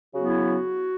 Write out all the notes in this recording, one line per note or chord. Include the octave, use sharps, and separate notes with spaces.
C#3 F#3 B3 E4 F#4